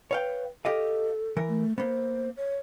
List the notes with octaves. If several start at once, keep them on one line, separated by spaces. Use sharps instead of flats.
B4 C#5 F5 G5
G4 A4 D#5 F5
E3 A#4
A3
A#3 B3 C5
C#5